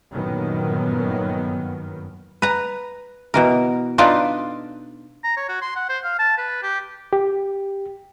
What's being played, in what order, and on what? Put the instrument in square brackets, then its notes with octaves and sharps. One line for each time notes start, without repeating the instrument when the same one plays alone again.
[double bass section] G1 F#2 A#2 D#3 F#3 B3
[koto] B4 A#5
B2 E3 A#4
D4 D#4 F4 A4 B4 D5
[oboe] A#5
C#5
F#4
C6
F#5
C5
F5
A5
B4
G4
[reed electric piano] G4